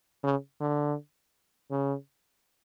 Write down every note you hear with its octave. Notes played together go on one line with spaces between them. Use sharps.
C#3
D3
C#3